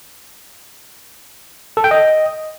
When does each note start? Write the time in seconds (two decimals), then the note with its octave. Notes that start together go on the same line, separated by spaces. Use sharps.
1.77 A4
1.84 G5
1.91 D#5